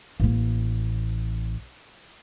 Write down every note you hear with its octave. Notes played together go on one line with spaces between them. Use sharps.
A1 A#3